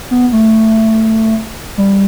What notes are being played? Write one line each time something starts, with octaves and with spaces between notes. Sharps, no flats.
B3
A3
G3